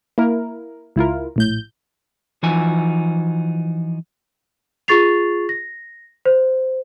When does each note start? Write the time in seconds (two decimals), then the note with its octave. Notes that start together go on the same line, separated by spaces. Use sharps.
0.18 A#3 E4 A#4
0.96 C#2 E4 F4 A#4
1.36 A#1 A2 G6
2.43 E3 F3 D#4 F#4 G#5
4.88 F4 G#4 C#6 A6 C7 F7
5.49 A#6
6.25 C5